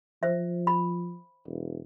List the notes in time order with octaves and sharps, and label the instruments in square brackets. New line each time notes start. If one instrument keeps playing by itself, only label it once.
[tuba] F3 [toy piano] C5 E5
[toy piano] B5
[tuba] E1